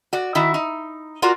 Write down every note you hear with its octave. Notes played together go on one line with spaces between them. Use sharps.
F#4 D5
D#3 E4 F#4
D#4
F4 F#4 A#4 D5